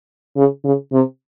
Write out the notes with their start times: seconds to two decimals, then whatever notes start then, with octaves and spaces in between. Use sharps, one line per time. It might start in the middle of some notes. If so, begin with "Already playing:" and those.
0.37 C#3
0.65 C#3
0.93 C3